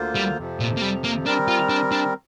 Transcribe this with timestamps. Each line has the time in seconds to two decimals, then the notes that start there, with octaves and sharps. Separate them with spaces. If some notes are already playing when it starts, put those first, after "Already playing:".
Already playing: D2 D3 A#3 F4 C5
0.15 G3
0.37 F2 C3 F3
0.60 A#2
0.77 A#3
0.82 G3
1.04 A#3
1.26 G3 C4 D4 A#4
1.48 F4
1.70 D4
1.92 D4